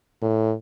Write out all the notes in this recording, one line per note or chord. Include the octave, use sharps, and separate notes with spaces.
A2